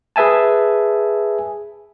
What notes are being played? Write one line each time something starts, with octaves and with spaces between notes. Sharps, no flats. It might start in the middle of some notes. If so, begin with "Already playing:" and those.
G#4 B4 E5 G#5 A5